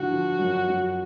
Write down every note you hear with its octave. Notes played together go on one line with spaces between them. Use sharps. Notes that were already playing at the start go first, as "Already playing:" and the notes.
Already playing: D3 F3 F#4
F3
F#2
F#2